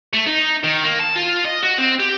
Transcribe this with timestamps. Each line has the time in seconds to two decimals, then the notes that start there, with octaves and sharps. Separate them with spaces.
0.13 A3
0.27 D#4
0.64 D#3
0.84 A#3
0.99 A5
1.16 F4
1.45 D#5
1.63 F#4
1.78 C4
1.99 G4